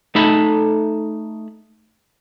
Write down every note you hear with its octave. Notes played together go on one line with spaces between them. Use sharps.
A3 D#4 A4 B5